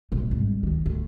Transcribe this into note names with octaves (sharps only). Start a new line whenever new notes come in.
B1 A2
G#1 G2
D2 D#3
D2